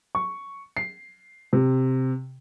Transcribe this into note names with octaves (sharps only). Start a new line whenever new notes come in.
C#6
C7
C3